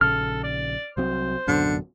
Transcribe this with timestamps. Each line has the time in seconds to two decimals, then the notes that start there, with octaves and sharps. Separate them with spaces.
0.01 A#1 C#3 A4 F6
0.43 D5
0.97 C2 F#3 C4 C5
1.47 D1 F#2 B2 D3